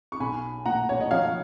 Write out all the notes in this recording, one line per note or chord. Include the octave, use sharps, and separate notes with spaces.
C#6
B1 G#5 B5
A#2 F#5 A#5
C#5
D#5
F3 C#5 F5